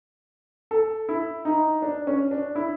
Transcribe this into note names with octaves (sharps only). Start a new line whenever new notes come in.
A4
E4
D#4
D4
C#4
D4
E4